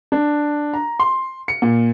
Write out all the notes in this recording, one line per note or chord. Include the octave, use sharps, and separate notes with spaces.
D4
A#5
C6
C#7
A#2